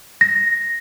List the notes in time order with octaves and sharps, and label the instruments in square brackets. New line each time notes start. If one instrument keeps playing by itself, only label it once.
[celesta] A#6